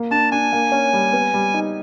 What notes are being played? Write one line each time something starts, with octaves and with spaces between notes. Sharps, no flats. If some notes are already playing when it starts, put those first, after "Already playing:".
Already playing: A#3
D4 A5
D4 G#5
A#3
C#4
G3
B3
G3
D#4